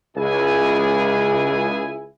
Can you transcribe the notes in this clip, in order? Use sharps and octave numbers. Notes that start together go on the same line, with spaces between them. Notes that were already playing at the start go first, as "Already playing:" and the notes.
C#2 E4 G#4 G#5